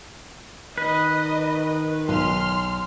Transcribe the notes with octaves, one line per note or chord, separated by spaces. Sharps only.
D#3 B4 D#5
B1 C6 F6